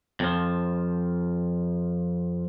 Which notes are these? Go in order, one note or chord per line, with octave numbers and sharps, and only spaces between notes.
F2 F3